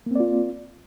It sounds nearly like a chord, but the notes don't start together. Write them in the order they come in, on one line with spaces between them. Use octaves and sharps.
A#3 C4 D5 F4